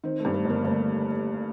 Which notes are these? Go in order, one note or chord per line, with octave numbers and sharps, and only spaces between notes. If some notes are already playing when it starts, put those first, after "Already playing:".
D#3 C4
A3
G2
A3
G1 A#3
G1 A3